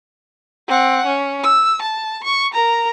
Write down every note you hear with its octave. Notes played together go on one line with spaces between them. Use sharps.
C4 F#5
C#4
E6
A5
C#6
A#4 A#5